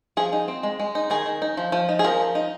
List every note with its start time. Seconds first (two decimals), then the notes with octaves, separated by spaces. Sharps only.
0.17 F3 G#4
0.33 D#4
0.48 C4
0.63 G#3
0.80 G#3
0.95 D#4
1.10 D#3 G#4
1.26 D#3
1.42 D#4
1.57 F3
1.72 F3
1.89 D#4
1.99 G#4
2.04 F3 A#4
2.20 F3
2.35 D#4